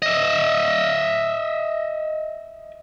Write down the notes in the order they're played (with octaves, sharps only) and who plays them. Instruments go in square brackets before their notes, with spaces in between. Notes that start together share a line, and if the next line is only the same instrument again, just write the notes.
[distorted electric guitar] D#5 E5